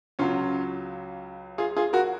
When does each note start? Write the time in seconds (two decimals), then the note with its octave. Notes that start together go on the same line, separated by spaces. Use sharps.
0.19 C#2 C#3 F#3 C#4 F4
1.58 F4 G#4
1.77 F4 G#4
1.93 F#4 A#4